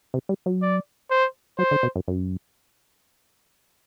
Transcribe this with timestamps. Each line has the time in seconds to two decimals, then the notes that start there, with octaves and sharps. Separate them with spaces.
0.14 C3
0.29 G3
0.46 F#3
0.62 D5
1.11 C5
1.58 F#3 C5
1.71 D3
1.83 B2
1.96 F#2
2.08 F#2